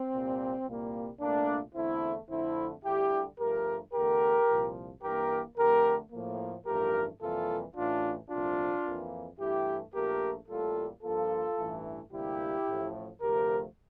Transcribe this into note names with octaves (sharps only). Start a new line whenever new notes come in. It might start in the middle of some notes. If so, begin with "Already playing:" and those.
Already playing: C4
C2 A#2 G3
C2 A#2 G3 A#3
C2 A#2 A3 A#3 D4
E2 D3 A3 C4 E4
F2 D3 A3 C4 E4
D2 D3 G3 E4 G4
G2 F3 A3 G4 A#4
E2 D3 A3 G4 A#4
C2 A#2 F3
G2 E3 A#3 G4 A#4
F2 D3 A3 G4 A#4
A2 F3 A#3
A1 G2 F3 A3 G4 A#4
F2 C3 E3 G3 A#3 F4 A4
A1 A2 E3 A3 D4 F4
C2 A#2 F3 A3 D4 F4
F2 E3 A#3
G2 E3 A3 E4 G4
A#1 A#2 A3 G4 A#4
A1 A2 G3 A#3 F4 A4
G2 F3 A#3 F4 A4
A1 G2 E3 A3
D2 C3 G3 A#3 E4 G4
A1 A2 F3 A3
D2 C3 F3 A3 G4 A#4